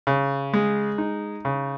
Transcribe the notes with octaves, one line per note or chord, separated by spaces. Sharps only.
C#3
G#3
D#4
C#3